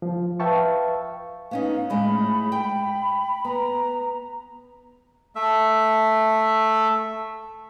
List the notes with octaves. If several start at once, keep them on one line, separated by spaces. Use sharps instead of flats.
F3
B4 E5 F5 G5 A5 C#6
B3 C#4 D#4 F5
A2 G#3 B5
G5 B5
B3 A#5
A3 E5